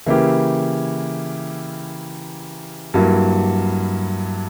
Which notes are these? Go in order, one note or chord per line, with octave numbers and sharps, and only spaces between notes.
C#3 E3 A#3 E4 G4
G2 F#3 A#3 E4